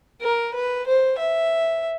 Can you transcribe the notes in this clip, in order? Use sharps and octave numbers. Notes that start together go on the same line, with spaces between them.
A#4
B4
C5
E5